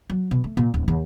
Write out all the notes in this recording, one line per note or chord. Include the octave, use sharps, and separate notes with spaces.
F#3
B2
A3
A#2
D1
D#2